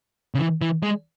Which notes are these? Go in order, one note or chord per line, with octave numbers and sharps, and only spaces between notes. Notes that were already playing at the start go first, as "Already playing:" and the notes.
C#3
E3
E3
G#3